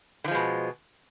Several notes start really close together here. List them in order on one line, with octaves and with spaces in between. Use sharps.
D3 F3 G#3 B2